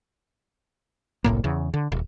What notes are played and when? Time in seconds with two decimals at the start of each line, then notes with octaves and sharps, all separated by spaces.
1.24 F#1 C2 A2 A#3
1.44 E2 C#3
1.74 D3
1.92 D#1